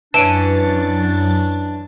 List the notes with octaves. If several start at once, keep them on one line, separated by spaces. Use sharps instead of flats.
F#2 E3 C#4 D4 A5 A6 D7 D#7